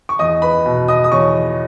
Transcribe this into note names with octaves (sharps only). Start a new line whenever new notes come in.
C#6
E2 D#5 D#6
B4 B5
B2
D#5 D#6
D#6
E2 C#5 C#6